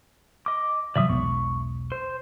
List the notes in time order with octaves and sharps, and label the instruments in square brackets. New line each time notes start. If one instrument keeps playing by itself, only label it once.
[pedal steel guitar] D#5 D6
[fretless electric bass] C3 D#3 F#3 [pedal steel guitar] D5 E5 D#6
[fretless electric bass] E1 B1 B2 [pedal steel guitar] C#6
[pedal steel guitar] C5